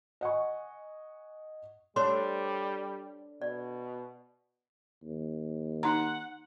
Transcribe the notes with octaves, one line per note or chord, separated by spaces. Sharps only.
D#5 F#5 G#5 C#6
G3 D4 A4 C5 C#5 C6
B2 D5
D#2
D#4 F#5 A#5